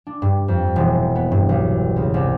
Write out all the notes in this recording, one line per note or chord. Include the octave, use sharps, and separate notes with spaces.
D4
G2
F2
E1
B3
G2
B1
C#2
C2